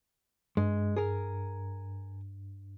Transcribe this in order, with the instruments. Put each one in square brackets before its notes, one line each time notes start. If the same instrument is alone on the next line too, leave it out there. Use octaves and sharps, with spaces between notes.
[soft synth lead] G2 [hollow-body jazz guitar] G#3
[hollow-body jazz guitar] G#4 A#4